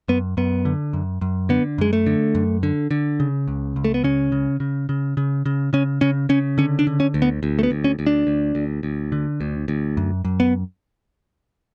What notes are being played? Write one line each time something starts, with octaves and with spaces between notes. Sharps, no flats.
F#2 B3
F#2 B3
D3
F#2
F#2
D3 B3
F#2 G#3
A3
D3
F#2
D3
D3
C#3
C#2
C#2
A3
B3
C#3 C#4
C#3
C#3
C#3
C#3
C#3
C#3 C#4
C#3 C#4
C#3 C#4
D3 C#4
D4
D3
C#4
D2
B3
D2
A3
B3
D2
C#4
D2
D4
D2
D2
D2
D3
D2
D2
F#2
F#2
B3